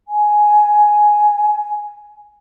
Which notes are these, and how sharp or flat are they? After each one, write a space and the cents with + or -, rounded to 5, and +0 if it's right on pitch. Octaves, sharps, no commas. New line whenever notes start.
G#5 +10